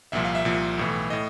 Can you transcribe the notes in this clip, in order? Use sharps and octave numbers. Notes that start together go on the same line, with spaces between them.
C2 A#2 F3 E5
F5
E5
C2 A#2 F3
B1 A2 E3
A2 D#5